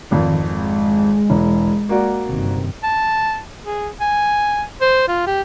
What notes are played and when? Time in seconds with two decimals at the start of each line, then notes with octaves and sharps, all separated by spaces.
0.11 G#1 F2 D#3
0.44 G#3
1.30 E1 E3
1.89 A#3 F#4 D5
2.27 G1 C3 D#3
2.84 A5
3.65 G#4
4.00 G#5
4.81 C5
5.08 F4
5.27 G4